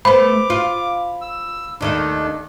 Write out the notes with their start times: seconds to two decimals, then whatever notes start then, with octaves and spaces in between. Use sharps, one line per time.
0.05 A3 B3 C5 B5 D6
0.50 F4
1.21 E6
1.81 D#2 D#3 A3 D4